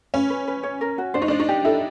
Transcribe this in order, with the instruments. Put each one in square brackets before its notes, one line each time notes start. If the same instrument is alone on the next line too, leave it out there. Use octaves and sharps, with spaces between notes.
[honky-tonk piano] C#4 [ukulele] B4
[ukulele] B4
B4
C#5
A#4
F#4
[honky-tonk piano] D4 [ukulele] C5
[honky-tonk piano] D#4
[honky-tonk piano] D4 [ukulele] C5
[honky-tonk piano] D#4
[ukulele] G4
[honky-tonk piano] E4 [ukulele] A4